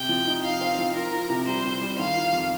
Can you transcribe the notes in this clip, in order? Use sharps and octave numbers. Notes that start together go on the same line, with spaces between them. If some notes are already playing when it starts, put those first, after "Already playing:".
Already playing: C3 G5
F3
D#4
D#4 F5
C4
F3
F4 A#4
F4
C3
G3 C5
C3
G3
D#3 F5
F4
F2